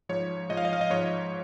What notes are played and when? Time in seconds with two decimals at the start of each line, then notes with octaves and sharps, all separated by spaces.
0.09 G#2 F3 C#5
0.49 G#2 F3 D#5
0.57 F5
0.65 D#5
0.73 F5
0.81 D#5
0.90 G#2 F3 C#5